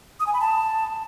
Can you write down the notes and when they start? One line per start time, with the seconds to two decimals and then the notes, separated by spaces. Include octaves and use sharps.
0.20 D#6
0.27 G#5
0.33 B5
0.40 A5